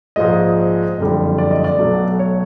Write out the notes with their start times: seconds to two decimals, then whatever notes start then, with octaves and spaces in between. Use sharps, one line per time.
0.16 A#1 G#2 F3 G#3 D#5
0.98 F#1 F2 D3 G3
1.38 D5
1.51 D#5
1.64 D5
1.79 B1 B2 F#3 A3
2.19 C#5